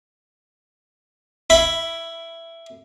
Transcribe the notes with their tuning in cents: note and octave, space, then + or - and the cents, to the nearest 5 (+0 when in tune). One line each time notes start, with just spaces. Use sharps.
E4 +10 B5 +0